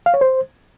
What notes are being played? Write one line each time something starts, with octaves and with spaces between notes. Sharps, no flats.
F5
C#5
C5